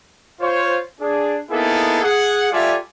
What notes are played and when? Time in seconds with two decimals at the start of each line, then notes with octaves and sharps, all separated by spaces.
0.40 F4 C5 C#5
1.00 D4 G#4
1.51 A#3 B3 D#4 E4 G#4 A4
2.03 G#4 F#5
2.52 G3 F4 A4 D5 E5 G#5